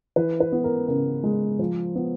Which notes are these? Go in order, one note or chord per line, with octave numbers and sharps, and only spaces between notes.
E3 B4
B4
B3
A#4
C#3 A#4
G#3
F3
B3